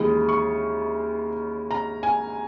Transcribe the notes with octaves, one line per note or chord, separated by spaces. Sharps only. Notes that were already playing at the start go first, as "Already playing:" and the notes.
Already playing: D#2 C#3 E3 G#3 D#6
C#6
A#5
G#5